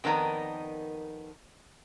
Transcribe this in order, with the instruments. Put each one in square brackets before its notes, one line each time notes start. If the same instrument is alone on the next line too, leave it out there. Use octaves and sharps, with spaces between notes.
[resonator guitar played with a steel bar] F2 D#3 B3 D#4 A#4 D5